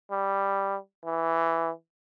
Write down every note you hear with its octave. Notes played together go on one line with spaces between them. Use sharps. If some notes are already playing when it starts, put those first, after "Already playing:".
G3
E3